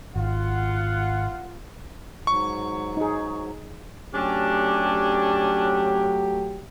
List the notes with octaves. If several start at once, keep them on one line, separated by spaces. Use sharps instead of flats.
G#1 F4 F#5
G#2 F#3 C#6
D#4 G#4
F#3 A3 C#4 D4 G4